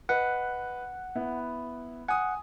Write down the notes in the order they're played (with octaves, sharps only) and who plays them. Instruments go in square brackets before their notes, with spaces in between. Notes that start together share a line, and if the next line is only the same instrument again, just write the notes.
[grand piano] B4 D#5 [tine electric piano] F#5
[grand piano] B3 E4
[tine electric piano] F#5 [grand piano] G#5 D#6